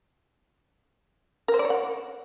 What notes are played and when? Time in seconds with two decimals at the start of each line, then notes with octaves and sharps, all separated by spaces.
1.48 A#4
1.54 C5
1.59 D5
1.65 C#5
1.70 F#5